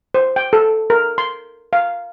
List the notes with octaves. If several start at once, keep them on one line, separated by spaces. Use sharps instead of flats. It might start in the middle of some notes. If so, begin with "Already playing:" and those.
C5
G5
A4
A#4
C6
F5